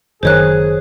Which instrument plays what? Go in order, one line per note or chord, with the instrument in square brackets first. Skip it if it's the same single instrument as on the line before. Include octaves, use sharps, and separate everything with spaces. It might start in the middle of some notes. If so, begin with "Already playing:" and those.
[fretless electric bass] F#1 D#3 [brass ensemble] G#4 [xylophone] C5 C#5 F#6